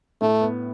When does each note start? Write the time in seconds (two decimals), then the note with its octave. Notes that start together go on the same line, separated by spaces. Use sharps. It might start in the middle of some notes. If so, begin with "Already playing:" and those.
0.21 A2 A3
0.41 B3